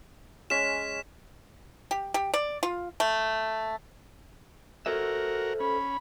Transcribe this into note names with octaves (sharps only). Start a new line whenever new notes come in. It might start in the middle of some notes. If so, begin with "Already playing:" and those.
G#3 C#4 G#5 B6 E7
G4
G4
D5
F4
A3
F#4 A4 A#4 C5 E5
C#4 B5